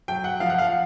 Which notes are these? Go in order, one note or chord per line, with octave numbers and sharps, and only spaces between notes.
F#3 G5
F#5
F3 F5
F#5
F5